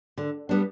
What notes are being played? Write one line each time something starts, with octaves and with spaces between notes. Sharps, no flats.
D3
G3 B3 D4